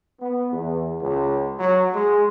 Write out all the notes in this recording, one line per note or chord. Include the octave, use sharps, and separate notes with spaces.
B3
E2
C#2
F#3
G#3